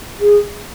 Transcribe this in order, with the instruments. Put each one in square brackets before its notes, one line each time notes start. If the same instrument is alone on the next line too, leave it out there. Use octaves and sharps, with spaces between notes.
[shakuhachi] G#4